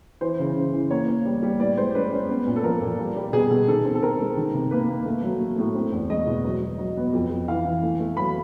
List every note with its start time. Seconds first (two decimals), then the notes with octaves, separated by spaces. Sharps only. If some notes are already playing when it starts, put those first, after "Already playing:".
0.21 E3 C5
0.39 C#3
0.56 E3
0.73 E3
0.91 A#3 C#5
1.08 A#3
1.25 G3
1.43 G3
1.60 A2 D5
1.77 G#3 C5
1.95 C#4 B4
2.12 C#4
2.29 B3
2.47 A#2
2.56 A4
2.64 F3 A#4
2.81 A#2
2.99 G3
3.16 G3
3.32 B2 G#4
3.50 B2 A4
3.68 D#3 A4
3.85 C4
3.95 A4
4.03 C4 A#4
4.20 G#3
4.37 D#3
4.54 C3
4.71 A#3 B4
4.88 A#3
5.05 A3
5.23 F#3
5.40 A3
5.58 A2
5.75 C4
5.92 E2
6.10 G#3 D#5
6.27 B2
6.44 F#3
6.61 F#3
6.78 F#3
6.97 B3
7.13 F2
7.31 F2
7.48 E3 F5
7.65 E3
7.83 A3
8.00 A3
8.17 F#3 B5